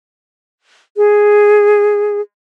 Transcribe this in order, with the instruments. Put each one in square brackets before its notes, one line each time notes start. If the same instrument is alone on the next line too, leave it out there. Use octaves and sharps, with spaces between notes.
[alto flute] G#4